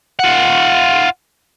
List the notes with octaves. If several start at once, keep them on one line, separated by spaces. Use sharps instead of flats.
F4 F#5